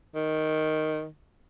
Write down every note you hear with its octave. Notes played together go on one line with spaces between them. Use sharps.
D#3